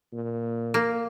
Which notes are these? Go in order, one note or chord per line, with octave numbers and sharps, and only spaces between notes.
A#2
A#3